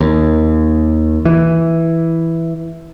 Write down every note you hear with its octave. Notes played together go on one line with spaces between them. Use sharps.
D#2
E3